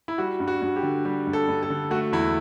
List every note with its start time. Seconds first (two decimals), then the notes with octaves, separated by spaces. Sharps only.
0.08 E4
0.18 G3 F#4
0.40 G2
0.48 F#4
0.62 G2
0.76 G4
0.83 D3
1.05 G3 G4
1.27 G2
1.33 A4
1.48 G2
1.63 A4
1.70 D3
1.91 A3 F#4
2.12 E2 E4